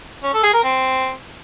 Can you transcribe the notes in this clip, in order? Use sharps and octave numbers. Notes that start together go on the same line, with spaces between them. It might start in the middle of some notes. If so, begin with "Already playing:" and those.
C#4
A4
G#4
A#4
C4